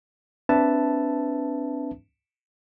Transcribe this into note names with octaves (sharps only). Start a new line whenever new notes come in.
C4 D4 B4 E5 A5